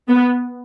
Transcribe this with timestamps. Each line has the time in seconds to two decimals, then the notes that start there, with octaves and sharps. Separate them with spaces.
0.08 B3